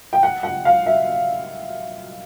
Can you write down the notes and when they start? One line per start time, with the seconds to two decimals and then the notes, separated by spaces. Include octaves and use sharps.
0.13 G5
0.23 F#5
0.43 F#5
0.65 F5
0.86 E5